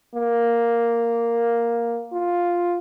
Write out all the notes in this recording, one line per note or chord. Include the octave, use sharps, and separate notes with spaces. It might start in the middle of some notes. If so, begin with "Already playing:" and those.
A#3
F4